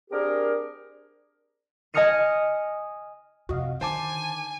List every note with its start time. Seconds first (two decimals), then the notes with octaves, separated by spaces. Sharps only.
0.10 C4 D4 G4 G#4 A#4
1.94 D#5 G#5 D#6 F6 C#7 D#7
3.49 F2 C3 F#4 D#5 F5
3.81 D3 D#3 C5 G#5 A5 D6